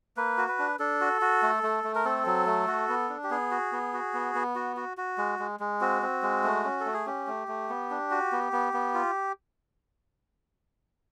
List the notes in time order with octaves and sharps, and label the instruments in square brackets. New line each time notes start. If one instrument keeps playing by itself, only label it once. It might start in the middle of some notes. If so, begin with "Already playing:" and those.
[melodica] A#3 B4
F#4
B4
D4
D4 A4
F#4
F#4
A3
A3
A3
A#4
C4 A4
F#3
A3
F#4
B3
D4
G4
B3 G#4
F#4
B3
F#4
B3
B3
F#4
F#4
F#4
G#3
G#3
G#3
C4 F#4
C4
G#3
A3
C#4
A4
A3
G#4
C#4 G4
A3
A3
B3
D4
F#4
B3
B3
B3
F4